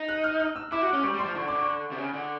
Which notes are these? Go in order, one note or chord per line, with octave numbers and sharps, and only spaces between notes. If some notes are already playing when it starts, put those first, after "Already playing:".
Already playing: D#4
F#6
F6
F6
E6
E4 D6
F#4
D6
C#4
G3 C#6
G3
C6
F3
D3 C#6
D3 D6
C#6
C3
C#3
D3